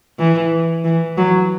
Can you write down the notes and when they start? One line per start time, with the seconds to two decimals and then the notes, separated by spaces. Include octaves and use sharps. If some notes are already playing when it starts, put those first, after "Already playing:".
0.19 E3
0.84 E3
1.17 F#3